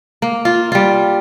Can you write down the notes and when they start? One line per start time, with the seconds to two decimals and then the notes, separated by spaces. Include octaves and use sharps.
0.22 A#3
0.45 F4
0.72 G3 F4